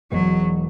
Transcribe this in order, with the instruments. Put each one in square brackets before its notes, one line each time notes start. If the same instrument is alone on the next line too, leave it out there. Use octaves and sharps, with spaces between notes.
[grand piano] E1 E2 B2 G#3 [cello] F#3